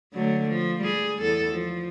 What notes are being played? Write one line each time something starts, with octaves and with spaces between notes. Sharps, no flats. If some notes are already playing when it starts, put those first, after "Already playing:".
D3 F#3 A3
F3
G3 G#4
E2 A4
F3